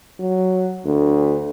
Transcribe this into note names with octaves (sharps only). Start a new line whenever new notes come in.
F#3
D2